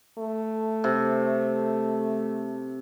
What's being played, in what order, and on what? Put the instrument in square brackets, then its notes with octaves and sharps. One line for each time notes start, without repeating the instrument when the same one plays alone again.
[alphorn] A3
[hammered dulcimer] C3